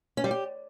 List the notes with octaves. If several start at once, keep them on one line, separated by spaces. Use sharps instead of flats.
C#4
G3
G4